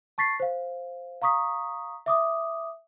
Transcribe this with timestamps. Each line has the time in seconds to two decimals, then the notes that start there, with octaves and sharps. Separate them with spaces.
0.18 A5 C#6 A6 B6 C7
0.40 C5 F5
1.22 F5 A#5 C#6 D#6 B6
2.06 E5 D6 D#6